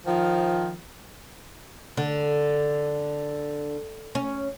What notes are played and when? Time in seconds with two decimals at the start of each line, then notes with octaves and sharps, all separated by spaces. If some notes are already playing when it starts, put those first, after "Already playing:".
0.06 D#3 F3
1.97 D3
4.15 C#4